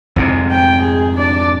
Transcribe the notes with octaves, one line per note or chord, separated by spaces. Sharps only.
F2 G#2 C3
G5
G#4
D4 D5